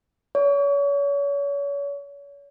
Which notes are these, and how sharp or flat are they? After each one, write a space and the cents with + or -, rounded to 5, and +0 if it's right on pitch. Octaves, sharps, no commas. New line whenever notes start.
C#5 +35